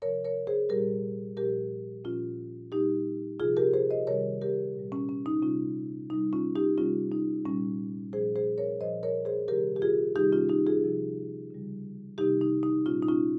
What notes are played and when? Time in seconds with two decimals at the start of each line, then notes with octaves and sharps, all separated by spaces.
0.02 C3 F3 A#4 C#5
0.25 A#4 C#5
0.47 G#4 C5
0.69 A#2 G3 G4 A#4
1.37 A#2 F3 G4 A#4
2.04 A#2 F3 C#4 F4
2.72 A#2 G3 D#4 G4
3.40 C3 F3 F4 G#4
3.57 G4 A#4
3.73 G#4 C5
3.91 C5 D#5
4.07 C3 D#3 G3 A#4 C#5
4.42 G4 A#4
4.75 A#2 G3
4.92 C#4
5.09 C#4
5.26 D#4
5.42 C3 G3 C#4 F4
6.10 C3 G3 D#4
6.33 C#4 F4
6.56 D#4 G4
6.78 C3 G3 C#4 F4
7.12 D#4
7.45 A#2 G3 C#4
8.13 A#2 F3 G#4 C5
8.36 G#4 C5
8.58 A#4 C#5
8.81 A#2 F3 C5 D#5
9.03 A#4 C#5
9.25 G#4 C5
9.48 C3 D#3 G3 G4 A#4
9.76 G4
9.82 F4 G#4
10.16 C3 D#3 G3 D#4 G4
10.32 C#4 F4
10.49 D#4 G4
10.67 F4 G#4
10.83 C3 F3
11.51 C#3 G3
12.18 C3 D#3 G3 D#4 G4
12.41 D#4
12.63 D#4
12.86 A#2 G3 C#4 F4
13.02 D#4
13.08 C#4 F4